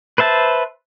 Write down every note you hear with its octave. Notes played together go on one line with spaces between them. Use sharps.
B4 C5 E5 A5